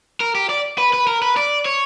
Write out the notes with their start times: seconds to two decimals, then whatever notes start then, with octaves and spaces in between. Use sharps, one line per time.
0.20 A#4
0.35 G4
0.49 D5
0.78 B4
0.93 B4
1.07 A#4
1.22 B4
1.37 D5
1.65 C#5